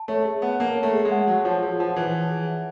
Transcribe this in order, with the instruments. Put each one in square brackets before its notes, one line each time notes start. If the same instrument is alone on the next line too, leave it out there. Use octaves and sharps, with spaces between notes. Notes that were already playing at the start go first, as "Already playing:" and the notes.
Already playing: [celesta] A5
[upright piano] A3 [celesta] C#5
[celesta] G#4
[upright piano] B3 [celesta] F#5
[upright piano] A#3 [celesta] A5
[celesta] C#5
[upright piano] A3
[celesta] G#4
[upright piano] G#3
[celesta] F#5
[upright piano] F#3 [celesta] A5
[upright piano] F3 [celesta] C#5
[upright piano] F3 [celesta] G#4
[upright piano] F3 [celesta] F#5
[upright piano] E3 [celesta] A5
[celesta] C#5
G#4
F#5